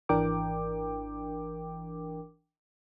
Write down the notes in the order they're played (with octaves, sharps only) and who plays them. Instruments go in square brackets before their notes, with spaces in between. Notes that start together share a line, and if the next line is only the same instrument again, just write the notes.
[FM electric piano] G#1 E3 D4 A#4 G5 D6